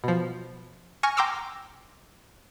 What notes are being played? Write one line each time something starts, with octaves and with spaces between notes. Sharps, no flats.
B2 F3
G#5 C#6 F6 A#6
G5 A#5 C6 D6 E6 F6